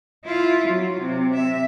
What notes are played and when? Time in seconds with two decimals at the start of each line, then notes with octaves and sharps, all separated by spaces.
0.25 E4 F4
0.68 F#3
1.01 C3
1.34 E5